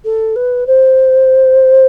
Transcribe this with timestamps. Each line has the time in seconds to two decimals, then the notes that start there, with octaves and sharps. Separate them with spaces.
0.04 A4
0.36 B4
0.67 C5